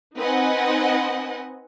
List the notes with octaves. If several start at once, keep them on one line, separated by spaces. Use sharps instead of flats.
C4 D#4 B4 D#5 F#5 G#5